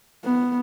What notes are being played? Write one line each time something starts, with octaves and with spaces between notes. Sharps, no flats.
B3